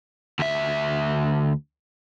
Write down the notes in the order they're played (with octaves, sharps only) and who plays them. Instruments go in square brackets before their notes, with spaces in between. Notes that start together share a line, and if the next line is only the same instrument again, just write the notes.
[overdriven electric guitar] D2 E5